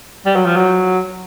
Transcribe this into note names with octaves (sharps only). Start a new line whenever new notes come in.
G3
F#3
F3
F#3